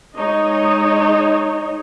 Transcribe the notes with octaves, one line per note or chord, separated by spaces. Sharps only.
G#3 D#4 C#5 D#5